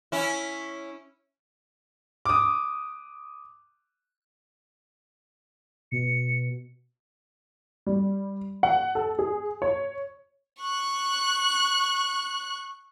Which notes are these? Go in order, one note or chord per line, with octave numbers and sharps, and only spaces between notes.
C#4 E4
D6 D#6
B2 C#7
G3
F#5
A4
G#4
C#5
C#6 F#6